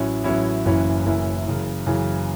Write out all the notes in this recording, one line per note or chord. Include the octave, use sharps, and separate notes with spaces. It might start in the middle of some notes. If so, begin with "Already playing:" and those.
Already playing: A1 A2 F#3 C#4 E4
A1 A2 F#3 C#4 E4
F#1 F#2 E3 C#4 E4
F#1 F#2 E3 C#4 E4
F#2 C#3 E3
F#2 C#3 E3